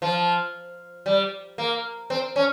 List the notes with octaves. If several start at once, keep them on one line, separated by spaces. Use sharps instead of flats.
F3
G3
A#3
C4
C#4